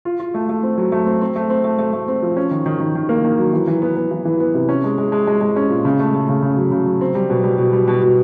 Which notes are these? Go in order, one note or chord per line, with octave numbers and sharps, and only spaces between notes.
F4
F4
A3
A3
C4
F#3
A3
C4
C4
A3
C4
A3
A3
A3
C4
F3
C#4
D#3
D#3
D#3
D#3
A#3
D#3
F#3
E3
E3
B3
B3
E3
E3
B3
C3
C#4
G#3
G#3
G#3
G#3
G#3
C#4
A#2
C#3
A3
A3
C#3
C#3
F#3
C#3
F#3
C4
G3
B2
G3
B2
G3
B2
B2